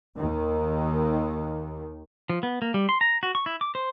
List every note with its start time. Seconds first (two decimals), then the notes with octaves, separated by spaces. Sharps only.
0.16 D#2 D#3
2.30 F3
2.43 B3
2.62 A#3
2.74 G3
2.89 C6
3.01 A#5
3.23 F#4
3.35 C#6
3.46 E4
3.61 D6
3.75 C5